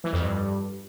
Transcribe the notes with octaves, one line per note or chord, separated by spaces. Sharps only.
E3
F2
G2